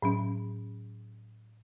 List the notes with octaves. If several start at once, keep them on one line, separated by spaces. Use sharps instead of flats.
A2 F#3 C#4